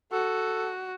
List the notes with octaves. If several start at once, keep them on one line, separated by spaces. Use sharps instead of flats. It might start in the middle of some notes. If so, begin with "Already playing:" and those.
F#4 A4